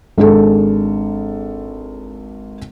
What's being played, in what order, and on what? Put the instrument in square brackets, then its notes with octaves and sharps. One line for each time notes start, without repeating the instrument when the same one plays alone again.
[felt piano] G#1 D4 G#4 A4